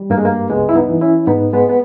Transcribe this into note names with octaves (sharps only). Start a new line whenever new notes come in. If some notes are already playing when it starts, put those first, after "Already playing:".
Already playing: G3
G2 A#3
G#3
A#3
C#2 G#3 B3
E4
B3 D#4
E3
C#4 E4
G#2 B3 D#4
G#3 B3
B3